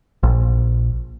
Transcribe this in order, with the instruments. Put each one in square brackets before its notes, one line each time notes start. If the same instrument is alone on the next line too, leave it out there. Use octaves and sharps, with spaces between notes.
[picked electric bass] A#1